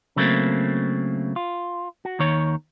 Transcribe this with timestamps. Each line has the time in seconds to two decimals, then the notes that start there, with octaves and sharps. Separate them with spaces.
0.16 C#3 F#3 A3 A#3 C4
1.36 F4
2.05 F#4
2.19 D#2 D#3 C#5